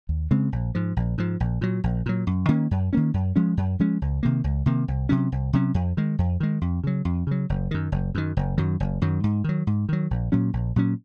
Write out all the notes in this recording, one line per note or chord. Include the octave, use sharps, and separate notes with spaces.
D#2
C#3 G#3 C4
A#1
G#2 F3
A#1
G#2 F3
A#1
A#2 F#3
A#1
A#2 F#3
F#2
D#3 A#3 C#4
F#2
D#3 A#3 C#4
F#2
F3 G#3 C#4
F#2
F3 G#3 C#4
C#2
C3 D#3 A#3
C#2
C3 D#3 A#3
C2
C3 F#3 C#4
C2
C3 F#3 C#4
F2
D#3 G#3
F2
D#3 G#3
F2
C#3 F#3
F2
C#3 F#3
F#1
F#2 D#3
F#1
F#2 D#3
F#1
F#2 D#3 F#3
F#1
F#2 D#3 F#3
G#2
D#3 F#3
G#2
D#3 F#3
A#1
A#2 F#3 C#4
A#1
A#2 F#3 C#4